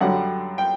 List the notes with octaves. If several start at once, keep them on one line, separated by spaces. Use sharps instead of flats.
F#2 D3 G3 F#5
G5